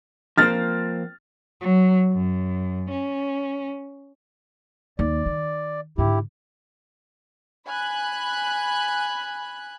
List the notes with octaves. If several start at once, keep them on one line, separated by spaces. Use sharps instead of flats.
F3 A#3 C4 F6 A6
F#3
F#2
C#4
D#2 D5
D#3
G#2 D3 E4 G4
G#5 B5 F#6